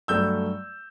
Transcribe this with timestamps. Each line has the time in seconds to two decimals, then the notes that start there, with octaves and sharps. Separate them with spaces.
0.08 G2 F#3 A3 E6 G6